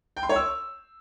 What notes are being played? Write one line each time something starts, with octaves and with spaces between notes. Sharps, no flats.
G5
C6
C#5
E6